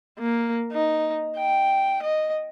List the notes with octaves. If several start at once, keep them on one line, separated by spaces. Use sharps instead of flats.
A#3
D#4
G5
D#5